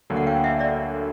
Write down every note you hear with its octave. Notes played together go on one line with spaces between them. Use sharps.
D2 D3 F#3 A#3
F#5
F5 G5
E5 F#5
D5 E5